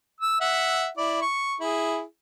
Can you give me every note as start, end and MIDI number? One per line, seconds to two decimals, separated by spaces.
0.20 0.40 88
0.41 0.88 76
0.41 0.88 78
0.98 1.22 64
0.98 1.22 74
1.22 1.56 85
1.61 2.02 64
1.61 2.02 68